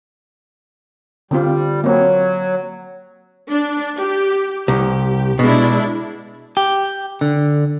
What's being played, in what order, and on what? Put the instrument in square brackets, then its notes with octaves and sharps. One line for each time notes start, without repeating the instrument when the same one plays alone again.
[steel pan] D3 C4 F4 [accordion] G3
[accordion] F#3 [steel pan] A#3 C4
[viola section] D4
G4
[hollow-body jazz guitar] C2 [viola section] G4
[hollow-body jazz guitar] B2 [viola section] G#3 D4 E4
[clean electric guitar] G4
D3